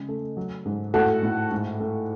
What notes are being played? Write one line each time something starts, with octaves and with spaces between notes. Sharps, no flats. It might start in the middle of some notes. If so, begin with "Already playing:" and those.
Already playing: C#3 G#3
A3
F#3
G#2
A2 F#4 A4
A2
G#2
A3